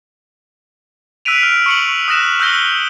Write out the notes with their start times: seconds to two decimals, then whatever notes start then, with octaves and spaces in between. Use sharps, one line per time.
1.25 E6 F#6 B6 D7 D#7 F7
1.43 F6
1.66 C#6 C#7 F#7
2.08 D#6 F#6 A#6 E7
2.40 E6 F#6 G6 A#6 G7